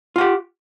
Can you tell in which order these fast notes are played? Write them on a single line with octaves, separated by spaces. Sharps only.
F4 F#5 G4